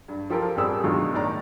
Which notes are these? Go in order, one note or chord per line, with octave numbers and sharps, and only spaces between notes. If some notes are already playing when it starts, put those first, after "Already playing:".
G2
F3 F4 G4 A4 A#4
A1 F2 G3 G4 G#4 E6
B2 D3 D#3 F#3 G#3 F4
A2 D#3 D5 A#5